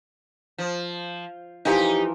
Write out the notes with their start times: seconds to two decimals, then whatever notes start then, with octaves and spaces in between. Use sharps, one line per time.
0.58 F3
1.65 E3 F3 D#4 G4 A#4